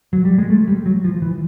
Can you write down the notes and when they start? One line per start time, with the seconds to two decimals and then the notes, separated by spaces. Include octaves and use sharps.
0.13 F#3
0.25 G3
0.38 G#3
0.50 A3
0.68 G3
0.86 F#3
1.04 F3
1.22 E3